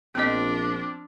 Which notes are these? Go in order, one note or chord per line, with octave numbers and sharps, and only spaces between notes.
A#1 F3 B3 C4 D4 D#5